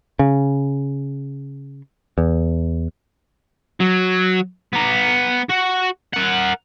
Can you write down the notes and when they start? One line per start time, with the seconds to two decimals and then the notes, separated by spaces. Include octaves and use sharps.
0.19 C#3
2.18 E2
3.80 F#3
4.73 B3 A#5
5.49 F#4
6.13 A#4 F#5